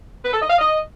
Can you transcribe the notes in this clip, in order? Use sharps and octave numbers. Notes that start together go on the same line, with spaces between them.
B4
A4
D#5
F5
D#5